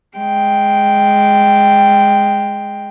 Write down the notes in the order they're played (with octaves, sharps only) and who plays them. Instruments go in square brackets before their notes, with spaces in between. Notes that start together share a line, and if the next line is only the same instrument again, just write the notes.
[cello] G#3 G5